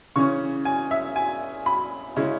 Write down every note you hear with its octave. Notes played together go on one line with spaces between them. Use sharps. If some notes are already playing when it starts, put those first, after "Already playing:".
C#3 E3 C#4 C#6
G#5
E5
G#5
B5
C#3 G#3 C#4 E4